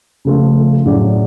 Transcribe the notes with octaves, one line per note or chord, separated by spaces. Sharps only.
C#3 F3 A3 F4 A4
A2 F#3 C#4 G#4 D5